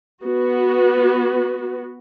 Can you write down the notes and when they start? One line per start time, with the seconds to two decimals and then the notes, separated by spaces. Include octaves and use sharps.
0.23 B3 F#4